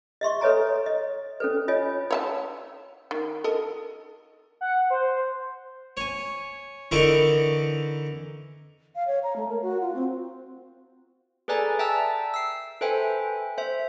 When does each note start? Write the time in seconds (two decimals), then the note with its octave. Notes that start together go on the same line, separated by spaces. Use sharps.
0.21 D#5 E5 C6 C#6
0.41 A4 B4 C#5 D#5 G#5 A#5
0.86 D#5
1.40 C#4 A4 B4
1.68 F4 C#5 D#5 G#5
2.11 C#5 D#5 A5
3.11 D#3
3.44 A4 A#4 D#5
4.61 F#5
4.90 C5
5.97 C#5 G#5
6.91 D3 E3 D#4 A#4 D5 C#6
8.95 F5
9.07 C#5
9.24 A#5
9.36 A3
9.49 A#4
9.62 F#4
9.81 F4
9.95 C4
11.48 G#4 A4 B4 D5 G#5 A#5
11.79 E5 G5 A5 A#5 E6
12.34 E6 C7
12.81 A4 B4 C5 E5 G5 G#5
13.58 C5 E5